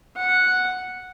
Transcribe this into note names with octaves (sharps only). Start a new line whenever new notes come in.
F#5